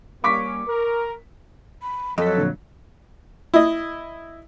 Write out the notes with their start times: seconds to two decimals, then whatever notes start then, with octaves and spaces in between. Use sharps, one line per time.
0.24 G3 A#3 C#4 C#6 D6 B6
0.67 A#4
1.82 B5
2.18 F2 F#3 A4 D#5 B6
2.38 A#2 D3
3.54 E4 D#5